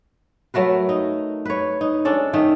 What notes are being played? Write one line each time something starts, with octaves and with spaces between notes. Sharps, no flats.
F#3 A3 A#4 B4
D#4
B4 C#5
D#4
G#3 C#4 D4 A4
D#3 A3 D#4